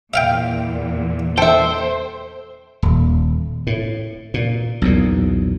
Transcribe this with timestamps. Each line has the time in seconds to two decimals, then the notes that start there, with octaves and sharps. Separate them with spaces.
0.14 E2 A#2 E5 F5 G5
1.38 A4 C5 E5 G5
2.82 D#1
3.67 A2
4.34 A#2
4.82 B1 E2 A#2